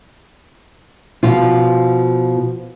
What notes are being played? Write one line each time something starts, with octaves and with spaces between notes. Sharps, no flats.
B2 F3 F4